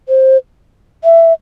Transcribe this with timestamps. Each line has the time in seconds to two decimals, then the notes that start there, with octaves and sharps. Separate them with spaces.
0.08 C5
1.04 E5